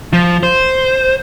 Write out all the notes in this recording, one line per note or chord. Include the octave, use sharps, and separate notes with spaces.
F3
C5